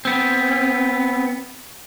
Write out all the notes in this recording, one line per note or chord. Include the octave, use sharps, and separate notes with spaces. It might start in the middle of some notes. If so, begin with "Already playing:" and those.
B3 C4